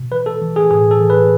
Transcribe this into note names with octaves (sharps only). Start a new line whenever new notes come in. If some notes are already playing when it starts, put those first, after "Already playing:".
Already playing: B2
E3 B4
A4
E3
G#4
A2 G#4
A4
E3
B4